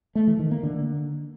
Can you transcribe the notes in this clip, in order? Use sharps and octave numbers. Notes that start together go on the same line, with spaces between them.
A3
E3
D#3
A#3
D3